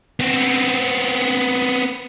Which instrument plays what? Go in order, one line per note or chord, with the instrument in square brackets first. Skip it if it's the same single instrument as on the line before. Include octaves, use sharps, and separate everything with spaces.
[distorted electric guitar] B3 C4